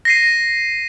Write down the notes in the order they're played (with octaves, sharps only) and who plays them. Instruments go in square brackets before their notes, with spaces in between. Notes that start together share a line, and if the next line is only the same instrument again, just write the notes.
[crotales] A#6 C7 D#7